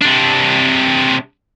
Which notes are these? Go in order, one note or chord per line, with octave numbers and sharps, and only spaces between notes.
C3 D4